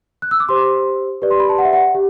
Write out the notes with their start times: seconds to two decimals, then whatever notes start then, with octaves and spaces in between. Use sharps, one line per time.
0.22 F#6
0.31 E6
0.40 D6
0.49 G4 C5 C6
1.22 G4 B4 D5
1.31 C6
1.40 B5
1.49 A5
1.58 F#5
1.65 E5
1.73 F#5
1.95 G4